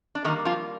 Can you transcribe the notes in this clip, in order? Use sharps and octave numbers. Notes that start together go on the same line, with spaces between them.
D4
D3 D#3 G3 A#3 D#4
F3 F4